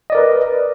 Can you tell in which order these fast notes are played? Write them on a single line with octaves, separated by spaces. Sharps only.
D#5 D5 A#4 B4